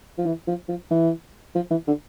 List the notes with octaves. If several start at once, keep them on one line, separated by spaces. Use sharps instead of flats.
F3
E3
F3
F3
E3
F3
E3
D3